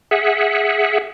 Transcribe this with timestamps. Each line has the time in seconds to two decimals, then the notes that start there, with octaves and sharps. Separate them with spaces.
0.11 G#4 E5 F#5